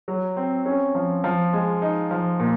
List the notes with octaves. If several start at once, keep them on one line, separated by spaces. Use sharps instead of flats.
F#3
C4
C#4
F3
F3
G#3
D#4
F3
A#2